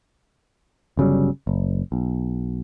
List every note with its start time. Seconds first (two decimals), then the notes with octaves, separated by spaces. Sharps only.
0.97 G1 C#3 F#3 G3
1.47 F#1
1.92 B1